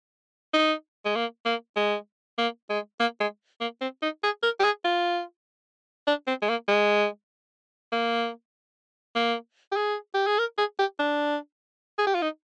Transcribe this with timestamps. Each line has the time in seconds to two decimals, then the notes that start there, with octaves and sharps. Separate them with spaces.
0.54 D#4
1.05 G#3
1.16 A#3
1.46 A#3
1.77 G#3
2.38 A#3
2.70 G#3
3.00 A#3
3.20 G#3
3.61 A#3
3.81 C4
4.02 D#4
4.23 G#4
4.43 A#4
4.60 G4
4.64 G#4
4.85 F4
6.08 D4
6.27 C4
6.42 G#3
6.49 A#3
6.68 G#3
7.93 A#3
9.16 A#3
9.72 G4
9.77 G#4
10.14 G4
10.27 G#4
10.39 A#4
10.58 G#4
10.79 G4
11.00 D4
11.98 G#4
12.07 G4
12.15 F4
12.22 D#4